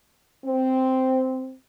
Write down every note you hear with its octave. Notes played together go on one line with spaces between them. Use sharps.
C4